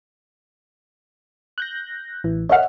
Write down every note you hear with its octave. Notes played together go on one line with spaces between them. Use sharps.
F#6 G6 A#6
A1 E3
C#5 D#5 E5 F#5 F6